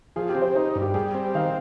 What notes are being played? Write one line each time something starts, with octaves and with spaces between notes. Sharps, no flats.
F3 G#4
G4
C4
C5
D#4 C5
G2
G4
G3 G#4
C4
D#3 F5